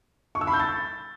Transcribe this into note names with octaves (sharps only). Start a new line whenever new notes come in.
C#6
E6
B5
G6
A6